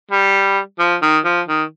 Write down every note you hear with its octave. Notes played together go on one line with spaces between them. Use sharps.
G3
F3
D#3
F3
D#3